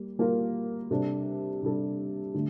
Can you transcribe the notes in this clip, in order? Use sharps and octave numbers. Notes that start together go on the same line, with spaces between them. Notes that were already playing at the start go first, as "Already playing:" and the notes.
Already playing: G3 A#3
G3 A#3 F4 A#4
C3 G3 D4 A4
C3 G3 D4 A4
D3 A3